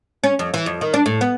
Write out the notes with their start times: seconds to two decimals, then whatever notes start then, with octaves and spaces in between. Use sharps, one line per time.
0.24 C#4
0.39 F2
0.54 E3
0.66 F2
0.81 D#3
0.94 D4
1.06 A2
1.21 B3